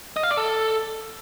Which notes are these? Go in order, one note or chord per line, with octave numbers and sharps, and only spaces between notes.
D#5
F5
D5
A4